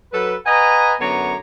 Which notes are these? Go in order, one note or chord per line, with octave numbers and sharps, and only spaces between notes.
F#3 A4 B4
B4 D#5 F#5 G#5 A#5
F#2 D3 B3 C#5 A#5